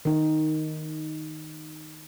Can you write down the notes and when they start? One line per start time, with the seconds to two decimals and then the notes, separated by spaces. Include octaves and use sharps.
0.05 D#3 D#4